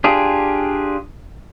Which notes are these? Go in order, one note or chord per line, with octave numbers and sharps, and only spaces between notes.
D4 F4 G4 G#4